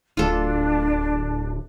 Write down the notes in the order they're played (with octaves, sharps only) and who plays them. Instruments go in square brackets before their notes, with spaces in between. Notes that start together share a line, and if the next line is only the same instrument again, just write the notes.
[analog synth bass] D1 [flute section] D4 [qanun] F4 A4